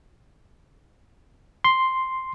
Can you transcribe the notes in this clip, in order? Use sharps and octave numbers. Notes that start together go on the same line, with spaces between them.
C6